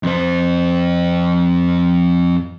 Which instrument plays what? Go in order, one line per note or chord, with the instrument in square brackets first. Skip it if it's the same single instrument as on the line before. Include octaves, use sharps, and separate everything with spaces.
[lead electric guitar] F2 C5